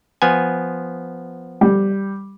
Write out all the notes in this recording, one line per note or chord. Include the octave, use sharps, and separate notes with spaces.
F3 B3 G#5
G3